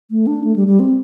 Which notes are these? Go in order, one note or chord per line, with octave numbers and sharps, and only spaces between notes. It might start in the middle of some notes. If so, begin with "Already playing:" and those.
A3
D4
A3
G3
G3
C4